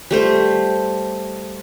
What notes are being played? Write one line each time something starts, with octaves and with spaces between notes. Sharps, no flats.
G3 A3 C5